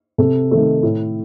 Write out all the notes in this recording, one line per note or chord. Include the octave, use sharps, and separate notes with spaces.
C3 A4
D#3 A3
A2